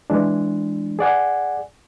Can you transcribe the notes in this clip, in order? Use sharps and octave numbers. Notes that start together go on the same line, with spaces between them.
E3 G#3 D4
G#4 D5 F#5 G#5